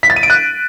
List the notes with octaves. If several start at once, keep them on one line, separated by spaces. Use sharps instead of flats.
B6
A6
D#7
D7
F#6